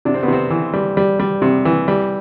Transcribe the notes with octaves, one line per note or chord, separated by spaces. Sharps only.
C3 D4
C4
B3
C3 C4
E3
G3
G3
G3
C3
E3
G3